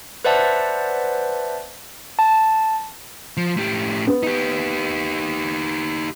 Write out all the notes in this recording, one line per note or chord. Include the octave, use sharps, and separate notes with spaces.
B4 C5 D5 E5 F#5 A5
A5
F3
A2 G4
B3
D#4 G4